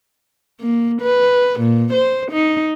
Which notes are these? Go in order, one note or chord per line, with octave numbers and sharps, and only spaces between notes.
A#3
B4
A#2
C5
D#4